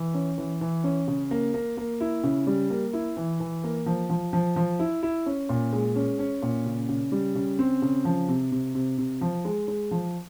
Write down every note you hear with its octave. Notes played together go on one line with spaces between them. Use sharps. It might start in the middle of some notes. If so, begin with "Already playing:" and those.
Already playing: E3
C#4
E3
E3
C#4
C#3
A#3
A#3
A#3
E4
C#3
G3
A#3
E4
E3
E3
A#3
F3
F3
F3
F3
E4
E4
C#4
A#2
G#3
C#4
C#4
A#2
C#3
C#3
G3
C#3
C4
C#3
F3
C3
C3
C3
C3
F3
G#3
G#3
F3